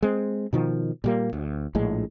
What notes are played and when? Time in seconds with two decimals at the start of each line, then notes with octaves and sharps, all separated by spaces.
0.03 G#3 C4
0.53 B2 D#3 F3
1.04 A#2 G3 A#3
1.33 D2
1.75 A#1 A2 G#3